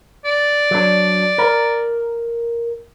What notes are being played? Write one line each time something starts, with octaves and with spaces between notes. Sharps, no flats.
D5
F#3 D4
A#4